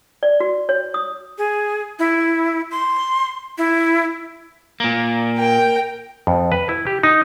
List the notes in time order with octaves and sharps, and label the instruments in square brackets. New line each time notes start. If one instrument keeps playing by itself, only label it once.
[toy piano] D5
F#4
C#5
D#6
[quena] G#4
E4
C6
E4
[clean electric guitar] A#2 A#3
[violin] A#4 G5
[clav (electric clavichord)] F2
B4
E4
G4
D#4